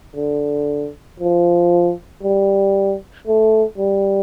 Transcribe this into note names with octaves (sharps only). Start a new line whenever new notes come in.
D3
F3
G3
A3
G3